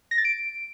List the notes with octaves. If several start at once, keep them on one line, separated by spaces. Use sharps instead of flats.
A#6
A6
D7